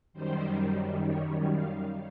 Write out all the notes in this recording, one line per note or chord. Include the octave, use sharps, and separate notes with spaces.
F#2 D#3 G3 C5
C#5
F5